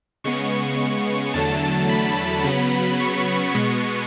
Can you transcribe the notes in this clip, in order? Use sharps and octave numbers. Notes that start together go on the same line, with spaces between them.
C#3 G#3 B3 C#6
E2 D3 F#3 A3 A5
B5
C#3 F#3 B3
C#6
B2 G#3 B3